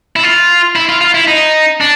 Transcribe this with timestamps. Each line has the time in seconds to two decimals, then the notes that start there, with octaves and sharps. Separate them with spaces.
0.16 E4
0.23 F4
0.76 E4
0.89 F4
1.01 F4
1.14 E4
1.28 D#4
1.81 D4